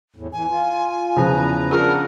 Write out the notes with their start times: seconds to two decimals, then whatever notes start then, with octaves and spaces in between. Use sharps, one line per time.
0.16 E2 A2
0.33 E3 G#5
0.49 F4
1.17 E2 C#3 F3 B4 A#5
1.71 D4 F4 G#4 A#4 F#5